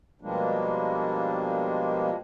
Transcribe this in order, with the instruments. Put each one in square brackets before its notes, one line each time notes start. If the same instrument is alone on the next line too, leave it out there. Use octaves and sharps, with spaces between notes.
[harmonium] B2 F3 G3 G#3 A#3 D4